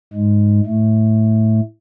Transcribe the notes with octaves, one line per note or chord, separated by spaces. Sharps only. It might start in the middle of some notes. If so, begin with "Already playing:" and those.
G#2 G#3
A2 A3